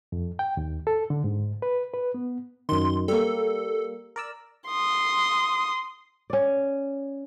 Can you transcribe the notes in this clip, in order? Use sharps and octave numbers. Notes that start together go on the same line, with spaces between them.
F2
G5
D#2
A4
D3
G#2
B4
B4
B3
F#2 D#3 C6
G3 A#3 A4
A#4 D5 E6
C6 D#6
C#4 D5